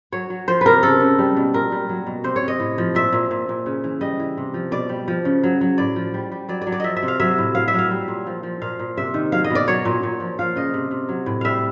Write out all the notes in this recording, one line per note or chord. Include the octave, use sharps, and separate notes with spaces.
F#3 C#5
F#3
F3 C5
C3 A#4 B4
C#3 A4
C#3
G3
B2
A#2 A#4
G3
F#3
B2
C3 C5
C#5
C3
D#5
A2
F3
A#2 E5
A#2
A#2
A#2
C#3
E3
G3 D#5
E3
C3
F3
B2 D5
G3
F3
C#3
F#3
F#3
A2 D5
F3
G3
G3
F#3 D5
D5
F#3
D5
F3 D#5 E5
E5
C3
F5
F#3 E5
A2
F#3 F5
E5
F#3
F5
G3
A#2
F3
F3
A#2 F5
A#2
C3 E5
D#3
F#3 F5
D#5
B2
D5
F#3 C#5
A#2
A#2
F3
F3 F5
C#3 D#5
C3
C3
F#3
A2
G3 E5 F5